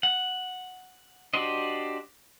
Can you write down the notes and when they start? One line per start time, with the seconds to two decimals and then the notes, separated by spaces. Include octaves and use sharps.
0.03 F#5
1.34 D4 F#4 G4 C5 D#5